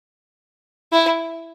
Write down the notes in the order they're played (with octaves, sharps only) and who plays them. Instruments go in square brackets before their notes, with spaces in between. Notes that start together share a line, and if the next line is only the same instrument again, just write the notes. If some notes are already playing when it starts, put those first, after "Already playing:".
[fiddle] E4